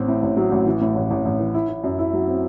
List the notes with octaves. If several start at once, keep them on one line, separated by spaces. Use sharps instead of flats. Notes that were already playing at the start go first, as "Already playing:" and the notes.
Already playing: A1 C4
A2
A1
F#3
A1
E3
A2
A1
A1
A1
E3
E4
E4
F#2
E4
F#3
C4